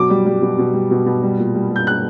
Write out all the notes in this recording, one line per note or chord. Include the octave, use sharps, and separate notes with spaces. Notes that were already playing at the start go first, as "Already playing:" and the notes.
Already playing: B2 F#3 D6
G3
G3
B2
B2
G3
B2
B2
G3
A#2
G3
G3
G6
A#2 F#6